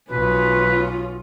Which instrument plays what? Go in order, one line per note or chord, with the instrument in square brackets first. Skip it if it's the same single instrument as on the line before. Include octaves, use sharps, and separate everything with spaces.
[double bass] B1 [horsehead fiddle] C#4 F4 [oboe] B4